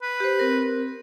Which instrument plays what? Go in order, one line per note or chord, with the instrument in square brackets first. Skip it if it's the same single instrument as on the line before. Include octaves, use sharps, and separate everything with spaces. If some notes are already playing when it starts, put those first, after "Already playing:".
[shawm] B4
[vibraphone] G4 C5
C4 A#4